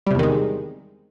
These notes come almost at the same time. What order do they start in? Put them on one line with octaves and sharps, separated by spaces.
G3 C3 E2 D#3 G#3